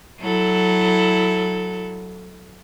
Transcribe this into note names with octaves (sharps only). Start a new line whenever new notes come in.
F#3 E4 A4